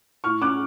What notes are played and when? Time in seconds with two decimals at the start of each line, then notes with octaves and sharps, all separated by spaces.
0.24 A2 C#6 F6
0.42 C#4 D6 F#6